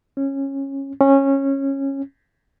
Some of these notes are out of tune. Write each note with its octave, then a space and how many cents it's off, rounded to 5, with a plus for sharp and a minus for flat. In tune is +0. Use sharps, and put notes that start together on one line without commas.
C#4 -15
C#4 -15